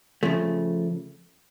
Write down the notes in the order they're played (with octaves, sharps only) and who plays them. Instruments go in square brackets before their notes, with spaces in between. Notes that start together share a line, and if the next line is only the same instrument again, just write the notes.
[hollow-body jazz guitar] C#3 F3 A3